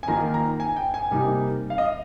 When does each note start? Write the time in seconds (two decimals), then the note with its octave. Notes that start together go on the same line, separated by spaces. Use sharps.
0.03 G#5
0.08 D#3 A#3 F4 A#5
0.34 A#5
0.60 G#5
0.76 G5
0.94 G#5
1.11 C3 G3 A#3 D#4
1.70 F5
1.78 D#5